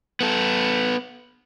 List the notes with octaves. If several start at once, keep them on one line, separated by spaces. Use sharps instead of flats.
B3 A4